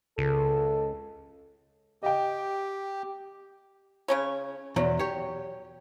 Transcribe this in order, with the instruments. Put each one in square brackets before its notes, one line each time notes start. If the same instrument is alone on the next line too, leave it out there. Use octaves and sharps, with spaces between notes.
[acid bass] C#2 [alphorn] A4
[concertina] G4 [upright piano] D#5 G5
[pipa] C#3 C#4 C#5
[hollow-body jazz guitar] E2 B2 [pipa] F#3
[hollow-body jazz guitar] G4 C#5